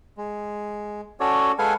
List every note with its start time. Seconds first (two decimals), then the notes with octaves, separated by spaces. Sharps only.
0.17 G#3
1.20 C#4 F#4 A4 C#5 D5
1.59 G#3 A4 B4 F5 F#5 G#5